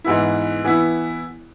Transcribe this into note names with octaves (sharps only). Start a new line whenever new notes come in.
G#2 E3 B3 E4
E3 B3 E4